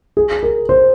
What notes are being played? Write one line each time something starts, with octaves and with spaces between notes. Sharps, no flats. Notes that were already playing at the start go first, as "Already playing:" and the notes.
G#4
A#4
C5